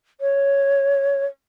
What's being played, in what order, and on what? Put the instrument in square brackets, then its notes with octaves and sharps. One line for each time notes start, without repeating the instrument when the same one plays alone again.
[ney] C#5